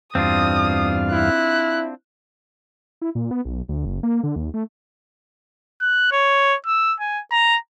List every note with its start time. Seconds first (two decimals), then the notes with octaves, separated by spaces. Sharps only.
0.15 E2 G2 C4 D4 F4 F5 D#6
1.13 E4 F#6
3.02 E4
3.15 A#2
3.31 B3
3.45 B1
3.69 D2
3.85 F#1
4.03 A#3
4.23 D3
4.36 D#2
4.54 A3
5.81 F#6
6.12 C#5
6.67 E6
7.00 G#5
7.31 A#5